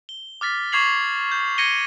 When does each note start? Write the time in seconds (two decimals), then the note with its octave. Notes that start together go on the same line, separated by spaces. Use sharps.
0.09 G7
0.41 D6 F6 A6 B6
0.72 C#6 D6 G#6 C7 F7 F#7
1.32 G6
1.58 G#6 A#6 C#7 D#7 G7